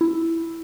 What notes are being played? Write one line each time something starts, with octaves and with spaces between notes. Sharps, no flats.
E4